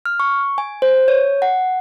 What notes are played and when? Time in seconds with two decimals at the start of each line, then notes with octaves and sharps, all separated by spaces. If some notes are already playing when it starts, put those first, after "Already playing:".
0.05 F6
0.20 C#6
0.58 G#5
0.82 C5
1.08 C#5
1.42 F#5